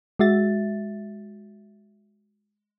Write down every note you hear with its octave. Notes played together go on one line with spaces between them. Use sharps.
G#3 F#4 E5 A6